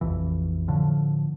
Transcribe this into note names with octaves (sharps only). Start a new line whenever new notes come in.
F1 A#1 F2 E3
A2 D3 F3